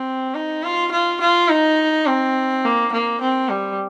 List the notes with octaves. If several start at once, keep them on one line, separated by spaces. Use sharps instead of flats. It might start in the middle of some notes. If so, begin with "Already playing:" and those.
Already playing: C4
D#4
F4
F4
F4
D#4
C4
A#3
A#3
C4
G3